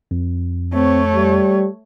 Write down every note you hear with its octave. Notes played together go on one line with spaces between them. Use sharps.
F2
A3 C4 C#5
G3